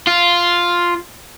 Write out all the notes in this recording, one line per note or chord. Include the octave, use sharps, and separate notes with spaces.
F4